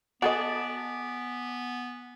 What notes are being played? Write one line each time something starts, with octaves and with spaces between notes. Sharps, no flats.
B3 F#4 A4 D5 D#5 G#5 A5